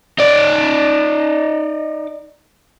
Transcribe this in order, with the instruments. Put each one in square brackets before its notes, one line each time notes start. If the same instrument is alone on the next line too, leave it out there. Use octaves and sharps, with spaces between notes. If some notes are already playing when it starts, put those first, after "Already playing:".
[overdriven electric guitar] D#4 D5